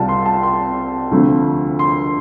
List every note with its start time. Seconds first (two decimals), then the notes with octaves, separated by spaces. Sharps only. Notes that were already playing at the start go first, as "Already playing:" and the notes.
Already playing: C2 C3 G3 C4 F4 A5
0.09 C6
0.26 A5
0.43 C6
1.11 D2 C3 F3 A3
1.79 C6